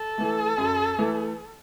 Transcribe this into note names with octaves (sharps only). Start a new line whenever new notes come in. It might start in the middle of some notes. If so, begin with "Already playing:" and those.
Already playing: A4
E3 A3
F#2
E3 A3